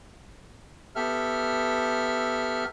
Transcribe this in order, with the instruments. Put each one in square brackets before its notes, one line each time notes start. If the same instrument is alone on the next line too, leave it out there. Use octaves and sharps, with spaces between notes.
[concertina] B3 G4 A4 E5 F6